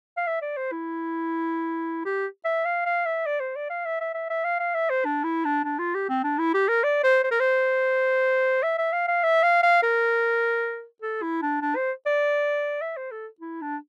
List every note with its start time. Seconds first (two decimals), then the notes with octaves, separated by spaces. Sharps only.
0.17 F5
0.27 E5
0.42 D5
0.57 C5
0.72 E4
2.05 G4
2.45 E5
2.65 F5
2.86 F5
3.06 E5
3.26 D5
3.40 C5
3.56 D5
3.70 F5
3.86 E5
4.01 E5
4.14 E5
4.30 E5
4.44 F5
4.60 F5
4.74 E5
4.90 C5
5.05 D4
5.24 E4
5.45 D4
5.65 D4
5.79 F4
5.95 G4
6.09 C4
6.24 D4
6.38 E4
6.54 G4
6.69 A#4
6.84 D5
7.04 C5
7.24 C5
7.31 A#4
7.40 C5
8.63 E5
8.78 E5
8.93 F5
9.08 F5
9.23 E5
9.43 F5
9.63 F5
9.83 A#4
11.02 A4
11.22 E4
11.42 D4
11.62 D4
11.76 C5
12.06 D5
12.81 E5
12.97 C5
13.11 A4
13.40 E4
13.61 D4